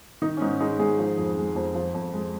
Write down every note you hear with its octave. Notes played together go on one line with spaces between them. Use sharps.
D#3 D#4
C#4
G#2 D#4
G#3 D#4
G#2 G#4
F3
F2
G#3
F2
F3
F2
G#3